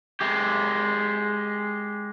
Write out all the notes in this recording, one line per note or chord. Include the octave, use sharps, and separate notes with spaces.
G#3 G4